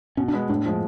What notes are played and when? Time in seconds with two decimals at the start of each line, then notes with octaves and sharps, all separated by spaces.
0.17 B2 C#4
0.28 D4
0.33 G#3 B3
0.49 A2 D4
0.65 F3 G#3